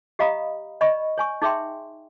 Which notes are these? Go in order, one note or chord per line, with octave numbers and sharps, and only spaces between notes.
G4 D#5 F5 A#5 B5 D#6
D5 D#5 B5 C#6
C#5 G#5 C#6
D#4 G#4 C#5 E5 G5 C6